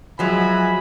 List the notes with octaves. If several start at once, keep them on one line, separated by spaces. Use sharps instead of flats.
F3 F#3 G#3 E5 G#5 B5